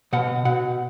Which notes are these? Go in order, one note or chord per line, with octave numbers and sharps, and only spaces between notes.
B2 F#5
B2 F#5